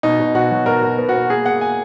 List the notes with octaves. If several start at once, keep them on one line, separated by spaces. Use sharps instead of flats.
B2 D#4
B2
B2 F#4
F#3
B2 A#4
B2
B3
F#4
B3
A#3 G#4
A#3 F#5
G#5